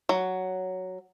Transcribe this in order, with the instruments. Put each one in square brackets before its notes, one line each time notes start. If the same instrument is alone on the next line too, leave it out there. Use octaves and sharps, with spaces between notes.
[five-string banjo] F#3